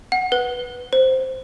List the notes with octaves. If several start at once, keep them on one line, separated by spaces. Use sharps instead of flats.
F#5
B4
C5